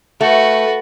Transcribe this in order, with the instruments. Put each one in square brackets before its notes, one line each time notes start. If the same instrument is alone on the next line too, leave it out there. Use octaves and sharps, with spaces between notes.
[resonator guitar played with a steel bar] A3 [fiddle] F#4 B4